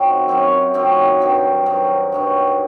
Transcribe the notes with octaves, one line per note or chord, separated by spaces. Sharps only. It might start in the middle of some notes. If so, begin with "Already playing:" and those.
Already playing: F#2 D#3 F#3 C4
F#2 D#3 F#3 C4
F#2 D#3 F#3 C4
G2 D#3 F#3
G2 D#3 F#3
G2 D#3 F#3